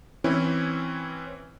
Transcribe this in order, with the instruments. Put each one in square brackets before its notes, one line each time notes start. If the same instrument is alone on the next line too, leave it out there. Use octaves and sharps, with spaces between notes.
[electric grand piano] E3 C4 C#4 E4